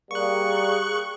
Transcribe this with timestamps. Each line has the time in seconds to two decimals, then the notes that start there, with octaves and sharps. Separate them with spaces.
0.11 G3 A#3 G#4 C#6 F#6